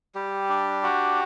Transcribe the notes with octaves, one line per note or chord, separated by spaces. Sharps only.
G3 G4
D4
F#4